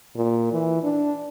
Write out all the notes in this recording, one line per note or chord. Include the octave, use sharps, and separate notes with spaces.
A#2
E3
D4